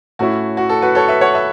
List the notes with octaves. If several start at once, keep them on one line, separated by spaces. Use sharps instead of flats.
A2 A3 C#4 E4 F#4
F#4
A4
F#4 B4
A4 C#5
B4 E5
C#5 F#5
B4 E5